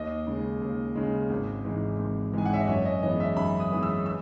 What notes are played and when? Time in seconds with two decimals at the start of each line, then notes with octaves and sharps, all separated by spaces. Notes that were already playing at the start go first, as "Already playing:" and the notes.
Already playing: D#2 D#5
0.27 C#3 G#3
0.61 D#2
0.96 C#3 G#3
1.30 G#1
1.65 G#2 E3 G#3
1.99 G#1
2.33 G#2 E3 G#3 G#5
2.46 F#5
2.54 E5
2.60 D#5
2.68 F#2 C#5
2.85 D#5
3.02 E3 G#3 B3 D#5
3.20 E5
3.37 F#2 B5
3.60 D#6
3.72 E3 G#3 B3
3.83 E6
4.06 E6